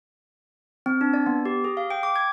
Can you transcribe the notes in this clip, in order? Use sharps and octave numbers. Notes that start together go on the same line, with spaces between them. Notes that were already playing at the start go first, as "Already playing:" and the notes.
C4
D4
D5
B3
G4
G#4
F5
G5
D6
G#6